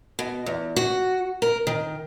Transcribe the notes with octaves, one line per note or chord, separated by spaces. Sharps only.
B2
E2
F#4
A#4
D#3